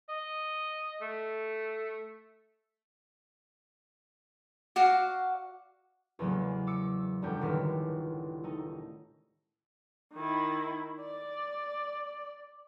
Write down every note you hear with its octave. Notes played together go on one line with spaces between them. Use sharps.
D#5
A3
F#4 D5 F5 F#5
E2 A2 C#3 F#3 G#3 A#3
D6 E6 C#7
F1 F#2 D3 G3 G6
G1 C#2 A2 D#3 F6 B6
A3 D#4
D#3 E4
D5